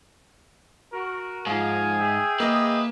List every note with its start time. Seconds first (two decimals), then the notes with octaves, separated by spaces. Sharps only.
0.93 F#4 A#4
1.47 G#2 F3 G#4 F5 G#5
2.00 G#4 E5 G5
2.40 A#3 B4 D#5